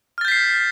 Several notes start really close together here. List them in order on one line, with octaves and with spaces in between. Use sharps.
F6 A6 G6 B6 C7